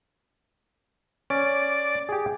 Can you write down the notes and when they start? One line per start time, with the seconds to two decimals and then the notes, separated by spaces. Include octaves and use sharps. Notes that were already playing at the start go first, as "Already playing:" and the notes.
1.30 C#4 D5
2.09 G4 G#4